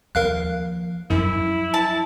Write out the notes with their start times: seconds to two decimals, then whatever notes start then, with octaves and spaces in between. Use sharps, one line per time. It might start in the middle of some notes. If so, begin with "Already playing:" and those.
0.15 D#2 F3 A#4 F5 F#6
1.10 F#2 F3 F#3 E4
1.74 A5